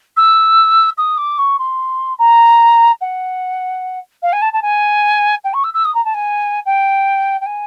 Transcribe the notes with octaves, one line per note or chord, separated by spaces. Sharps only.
E6
D#6
D6
C#6
C6
A#5
F#5
F5
G#5
A5
A5
G#5
G5
C#6
E6
E6
D#6
A#5
A5
G#5
G5
G5
G#5